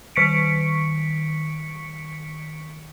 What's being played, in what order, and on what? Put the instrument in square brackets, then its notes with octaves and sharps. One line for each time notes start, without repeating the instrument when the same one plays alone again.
[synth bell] D#3 C#6 B6 C#7 D7